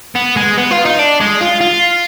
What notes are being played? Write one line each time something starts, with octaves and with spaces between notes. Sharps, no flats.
B3
G#3
B3
F4
D#4
D4
G#3
F4
F4